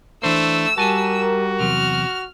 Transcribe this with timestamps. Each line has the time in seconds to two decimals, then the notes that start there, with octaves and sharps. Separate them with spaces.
0.23 E3 A3 D4 C5 E6
0.78 G3 F#4 G4 A#4 G#5 A5
1.60 E2 C3 F#3 F6